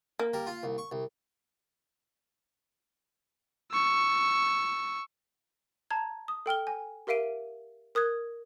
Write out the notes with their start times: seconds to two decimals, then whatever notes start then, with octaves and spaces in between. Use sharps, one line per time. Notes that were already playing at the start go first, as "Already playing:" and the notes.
0.19 A#3
0.33 G3 A#4
0.47 F4
0.63 C2
0.78 C#6
0.92 C2
3.72 C#6 E6
5.90 A5 A#5 G#6
6.28 D#6
6.46 A4 G5 F6 G7
6.67 G#5
7.07 G4 A#4 E5 F5 D7 D#7
7.95 A#4 D#6 F#6 G#6